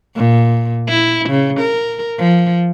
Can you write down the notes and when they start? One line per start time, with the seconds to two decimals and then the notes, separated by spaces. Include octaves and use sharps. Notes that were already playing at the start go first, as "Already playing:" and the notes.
0.16 A#2
0.89 E4
1.29 C#3
1.60 A#4
2.18 F3